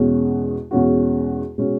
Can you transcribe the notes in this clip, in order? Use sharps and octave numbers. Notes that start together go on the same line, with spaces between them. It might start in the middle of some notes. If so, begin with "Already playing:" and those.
Already playing: E2 B2 G#3 C#4 F#4
E2 B2 G#3 C#4 F#4
B2 G#3 C#4 F#4